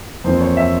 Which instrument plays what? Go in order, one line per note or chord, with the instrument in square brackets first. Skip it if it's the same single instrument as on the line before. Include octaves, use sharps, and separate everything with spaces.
[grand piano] F2 E3 A#3 F4 C5
C#5
E5